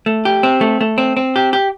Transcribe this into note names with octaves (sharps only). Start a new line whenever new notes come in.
A3
G4
C4
A3
A3
C4
C4
G4
G4